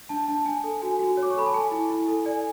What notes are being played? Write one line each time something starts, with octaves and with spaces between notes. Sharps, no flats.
D4 A5
D4 A5
D4 G#5
A4
F#4 G#5
F#4
C#5
D6
C#6
A4 B5
A5
A4 G#5
E4
E4
A4
D5 G#5